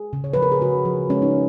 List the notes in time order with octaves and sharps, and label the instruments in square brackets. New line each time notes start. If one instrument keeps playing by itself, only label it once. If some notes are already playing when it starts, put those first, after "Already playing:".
Already playing: [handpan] G#4
C#3
C#5
F3 B4
A#4
G#4
C#3 F#4
F3
G#3 C#4
D#4